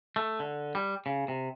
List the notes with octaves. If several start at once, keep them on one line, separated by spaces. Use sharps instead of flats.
A3
D3
G3
C#3
C3